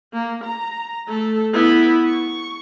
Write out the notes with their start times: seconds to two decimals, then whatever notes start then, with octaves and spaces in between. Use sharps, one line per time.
0.13 A#3
0.44 A#5
1.08 A3 A4
1.53 B3 E4
2.06 C#6